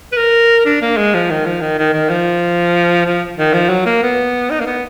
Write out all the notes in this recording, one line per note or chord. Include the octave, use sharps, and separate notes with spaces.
B4
A#4
D4
A#3
G#3
F3
D#3
F3
D#3
D#3
D#3
F3
F3
D#3
F3
F#3
A#3
B3
D#4
A#3
B3